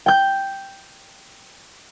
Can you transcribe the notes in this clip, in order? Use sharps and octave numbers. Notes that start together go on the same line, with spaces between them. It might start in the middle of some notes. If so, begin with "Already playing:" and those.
G5 G6